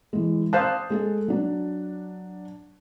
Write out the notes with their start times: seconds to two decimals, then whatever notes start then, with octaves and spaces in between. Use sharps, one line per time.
0.13 E3 G#3
0.53 C5 F5 A5 D#6 F#6
0.90 G#3 G#4 A4
1.28 F#3 D4